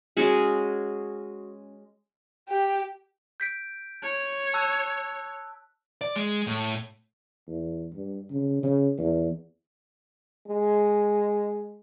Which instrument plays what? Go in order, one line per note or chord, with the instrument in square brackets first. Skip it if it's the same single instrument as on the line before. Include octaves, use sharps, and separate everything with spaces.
[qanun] G#3 C#4 F#4 G#4
[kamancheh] G4
[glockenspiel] G6 B6 D7
[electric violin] C#5
[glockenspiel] A5 E6 F#6
[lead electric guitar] D5
G#3
A2
[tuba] E2
G2
C#3
C#3
E2
[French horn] G#3